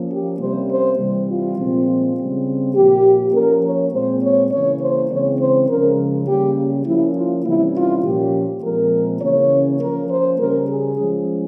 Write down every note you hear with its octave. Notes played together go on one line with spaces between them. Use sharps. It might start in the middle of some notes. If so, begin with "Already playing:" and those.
Already playing: F3 A#3 C#4
G4
C3 G3 A#3 C#4 C5
C5
C3 E3 G3
F4
A#2 F3 G#3 C4
C#3 G3 C4
A#2 F3 A#3 G4
F3 A#3 C#4 A#4
C#5
A#2 G#3 C4 C5
C#5
C#3 E3 A#3 C#4 C#5
C5
C#3 E3 G#3 C4 C#5
C5
C#3 F3 G#3 C#4 A#4
C#3 G3 A#3 C#4 G4
F3 A#3 C#4 E4
F4
C3 E3 G3 C#4 E4
F4
A#2 F3 A#3 C#4 G4
A#2 F3 G#3 C4 A#4
C#3 E3 A#3 C#4 C#5
F3 A#3 C#4 A#4
C5
C#3 G3 C#4 A#4
G#4
F3 G#3 C#4